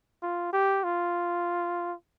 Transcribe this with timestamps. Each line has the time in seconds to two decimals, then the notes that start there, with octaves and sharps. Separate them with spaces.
0.23 F4
0.53 G4
0.84 F4